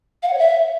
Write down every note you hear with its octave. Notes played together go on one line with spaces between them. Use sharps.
F5
F#5
C#5
E5